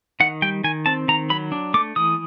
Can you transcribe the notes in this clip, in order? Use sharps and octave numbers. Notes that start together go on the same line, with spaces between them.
D#3 F#5
G3 G5
D#3 G#5
C4 A5
D#3 A#5
F#3 B5
D4
A3 D6
E3 D#6